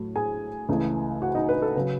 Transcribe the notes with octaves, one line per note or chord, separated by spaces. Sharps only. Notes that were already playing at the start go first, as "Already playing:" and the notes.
Already playing: A2 F#3 A3
G#4 G#5
C#2 C#3 E3 A3
F#4 F#5
D#4 D#5
B4
A4
C#3 F#3 B4